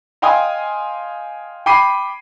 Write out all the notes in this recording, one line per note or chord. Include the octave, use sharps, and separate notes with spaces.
D#5 F5 G5 G#5 C6 D#6
G5 B5 D6 C7 D#7